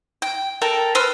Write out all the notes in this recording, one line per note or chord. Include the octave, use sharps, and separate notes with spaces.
G5
A4 A#4 G5 A5
B4 C5 E6 F6